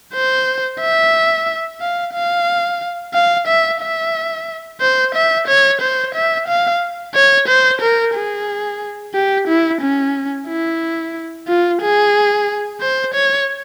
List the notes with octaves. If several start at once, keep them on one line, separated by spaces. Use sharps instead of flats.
C5
E5
F5
F5
F5
E5
E5
C5
E5
C#5
C5
E5
F5
C#5
C5
A#4
G#4
G4
E4
C#4
E4
F4
G#4
C5
C#5